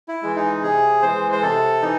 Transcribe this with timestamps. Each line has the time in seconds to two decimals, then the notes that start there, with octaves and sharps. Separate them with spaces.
0.08 E4
0.22 E3 G#3
0.36 D#4
0.61 C3 G#4
1.02 E3 G#3 C5
1.32 C5
1.42 C3 A4
1.82 E3 D#4